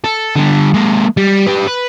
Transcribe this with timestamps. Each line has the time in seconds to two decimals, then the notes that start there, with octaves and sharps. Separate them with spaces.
0.04 A4
0.36 D3 G3
0.74 G#3 A#3
1.17 G3
1.47 G4 B4
1.68 B4